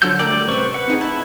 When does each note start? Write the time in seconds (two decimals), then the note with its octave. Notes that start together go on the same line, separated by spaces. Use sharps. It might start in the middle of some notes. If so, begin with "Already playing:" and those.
0.02 D3 F3 F#3 F#5 E6 G6
0.19 G3 A3 A#4 D5 G5
0.48 A1 C3 B4 C5 C#6 E6
0.74 B4 F#5
0.88 C4 D#4 G#4
1.01 E4 A5